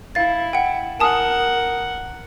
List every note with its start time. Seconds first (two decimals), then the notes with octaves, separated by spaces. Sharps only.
0.15 E4 F5 A6
0.53 F#5 G5
1.00 A#4 F#5 G#5 A5 D#6